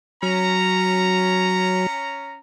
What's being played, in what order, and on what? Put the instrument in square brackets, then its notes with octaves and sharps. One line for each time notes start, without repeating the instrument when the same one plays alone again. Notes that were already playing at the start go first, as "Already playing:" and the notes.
[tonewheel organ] F#3 [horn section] C#4 A#5